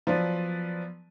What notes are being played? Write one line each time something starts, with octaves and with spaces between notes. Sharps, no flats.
F3 F#3 B3 F4 B4 D5